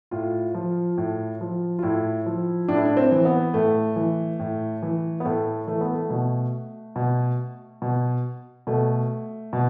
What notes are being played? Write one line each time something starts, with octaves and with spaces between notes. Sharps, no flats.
A2 F4
F3
A2
F3
F4
A2 E4
F3
A2 D4
E4
D4
C4
E3
B3
A2 A3
E3
A2
E3
B3
A2 A3
E3 A3
B3
A3
B2
B2
B2
B2 A3
B2